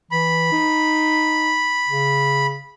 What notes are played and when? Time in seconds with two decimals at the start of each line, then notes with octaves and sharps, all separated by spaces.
0.11 E3 B5
0.52 D#4
1.89 C#3